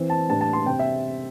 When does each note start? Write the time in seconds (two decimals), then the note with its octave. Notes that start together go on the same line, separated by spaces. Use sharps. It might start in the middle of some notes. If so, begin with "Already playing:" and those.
Already playing: E3 C4 E4
0.10 A5
0.29 A2 E3 G3 D4 A5
0.41 A5
0.53 C6
0.66 C3 G3 C4 G5
0.79 E5